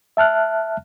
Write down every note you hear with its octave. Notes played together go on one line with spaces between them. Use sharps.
E5 A5 F6 F#6